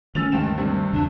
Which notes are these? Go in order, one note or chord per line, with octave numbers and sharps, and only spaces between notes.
D#3 F3 A3 C#4 E6 A6 F7
D2 G2 D#3 G#3 G5 E7
G2 C3 G3
E2 C#3 D4